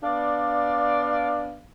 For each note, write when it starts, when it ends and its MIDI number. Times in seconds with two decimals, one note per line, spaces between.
0.04 1.60 59
0.04 1.60 62
0.04 1.60 74
0.04 1.60 77